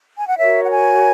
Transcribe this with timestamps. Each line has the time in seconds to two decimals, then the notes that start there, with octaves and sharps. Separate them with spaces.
0.17 G#5
0.28 F#5
0.38 F#4 A#4 C#5 E5
0.65 F#5
0.71 G#5